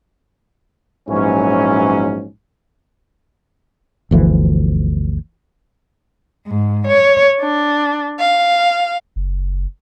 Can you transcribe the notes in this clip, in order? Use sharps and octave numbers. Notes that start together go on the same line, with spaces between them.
A#1 G#2 E3 F#3 C#4
G1 D2 E3 F3
G#2
C#5
D4
F5
F#1